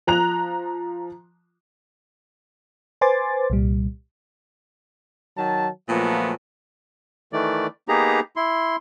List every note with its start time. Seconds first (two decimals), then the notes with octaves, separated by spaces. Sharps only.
0.07 F3 A#5 F#6 F7
3.01 B4 C5 G#5 C6 D6 A6
3.50 C2 A#2 G3
5.37 D#3 F#3 A5
5.88 A#2 F3 F#3 A3 B3
7.33 D#3 E3 A3 D5
7.88 A#3 B3 D#4 G4 G#4 A#5
8.36 E4 C6